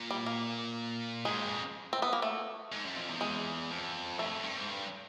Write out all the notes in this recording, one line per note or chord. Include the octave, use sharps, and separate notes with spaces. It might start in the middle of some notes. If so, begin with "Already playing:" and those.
Already playing: A#2
G3
A#3
G#2 G#3
G2
F2
C4
B3
A#3
A3
G#2
F#2
F2
E2
G#3
F2
G2 A3
F2
G2
G#2
G2